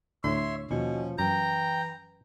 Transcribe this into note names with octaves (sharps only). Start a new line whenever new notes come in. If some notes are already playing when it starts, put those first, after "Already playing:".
D2 A2 D4 C#5 E5 C6
D#2 B2 F3 C#4
F#2 E3 G5 A#5